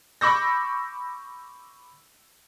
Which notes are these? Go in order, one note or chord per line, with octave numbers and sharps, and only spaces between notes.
B5 C#6 D6 E6 G6 A#6